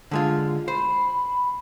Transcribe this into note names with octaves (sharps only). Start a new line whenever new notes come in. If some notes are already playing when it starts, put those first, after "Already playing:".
D3 G#3 F4
C5 B5